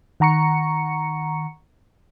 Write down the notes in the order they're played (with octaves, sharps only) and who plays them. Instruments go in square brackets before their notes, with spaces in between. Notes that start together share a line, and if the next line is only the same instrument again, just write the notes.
[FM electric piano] D#3 F#5 A#5 C#6 C#7